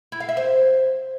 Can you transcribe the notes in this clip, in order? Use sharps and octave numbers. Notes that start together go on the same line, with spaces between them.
E4
F5
E5
C5